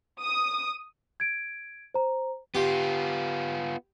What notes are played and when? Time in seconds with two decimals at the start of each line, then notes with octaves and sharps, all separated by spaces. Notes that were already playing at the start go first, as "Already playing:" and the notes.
0.22 D#6
1.20 G#6 D7
1.94 C5 A#5
2.55 B3 F4 G4